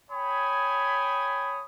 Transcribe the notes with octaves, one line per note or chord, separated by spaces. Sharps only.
C#5 G5 G#5 B5 D#6